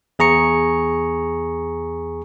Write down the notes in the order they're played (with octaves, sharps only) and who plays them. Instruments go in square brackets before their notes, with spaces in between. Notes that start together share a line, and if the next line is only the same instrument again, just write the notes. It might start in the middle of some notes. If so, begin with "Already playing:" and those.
[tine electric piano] E2 G#4 A#5 C#6 C#7